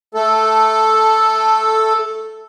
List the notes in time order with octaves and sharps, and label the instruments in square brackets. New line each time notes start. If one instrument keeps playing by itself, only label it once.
[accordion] A3 A4